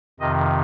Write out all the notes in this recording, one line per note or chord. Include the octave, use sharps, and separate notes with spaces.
F2 C3 D#3 D#5